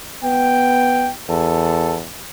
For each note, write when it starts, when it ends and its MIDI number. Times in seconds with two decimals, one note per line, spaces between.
0.24 1.10 59
0.24 1.12 79
1.29 2.04 40
1.29 1.97 69